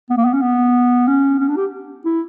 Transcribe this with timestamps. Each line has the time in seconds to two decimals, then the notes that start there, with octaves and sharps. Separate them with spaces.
0.10 B3
0.17 A#3
0.25 B3
0.33 C#4
0.42 B3
1.08 C#4
1.40 C#4
1.48 D4
1.57 G4
2.05 E4